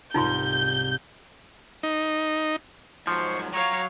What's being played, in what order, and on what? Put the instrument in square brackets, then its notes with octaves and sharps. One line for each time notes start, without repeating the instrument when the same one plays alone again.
[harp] C2 G#2 [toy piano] D#4 F4 C6 [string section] G6
[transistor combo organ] D#4
[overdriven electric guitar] G#2 F#3 [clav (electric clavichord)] F3 [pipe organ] C5 C#6
[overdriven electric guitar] F#3 [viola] C#5 F5 [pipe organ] A#5